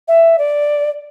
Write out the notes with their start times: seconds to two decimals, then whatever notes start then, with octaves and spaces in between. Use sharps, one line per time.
0.08 E5
0.38 D5